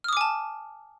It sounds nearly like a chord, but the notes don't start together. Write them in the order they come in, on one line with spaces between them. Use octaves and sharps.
F6 D#6 D6 G#5 A5